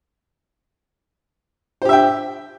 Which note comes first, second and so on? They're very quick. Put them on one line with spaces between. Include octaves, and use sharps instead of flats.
C5 G4 E5 G5